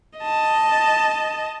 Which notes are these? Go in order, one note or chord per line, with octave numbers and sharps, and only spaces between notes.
D#5 A5